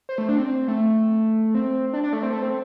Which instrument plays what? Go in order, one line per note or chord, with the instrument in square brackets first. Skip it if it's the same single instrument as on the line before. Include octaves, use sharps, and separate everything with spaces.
[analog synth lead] C5
A3
D4
C4
A3
C4
D4
D4
A3
C4
A3
C4